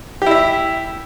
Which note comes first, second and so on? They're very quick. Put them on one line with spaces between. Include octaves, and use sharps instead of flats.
G4 E4 E5